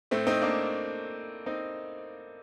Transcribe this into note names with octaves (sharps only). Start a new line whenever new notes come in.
A2 A3 C4
C4 D#4
A#3 D4
C4 D#4